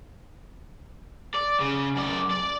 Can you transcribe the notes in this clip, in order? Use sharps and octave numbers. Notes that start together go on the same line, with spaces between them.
D5
C#3
F#2 D5
D5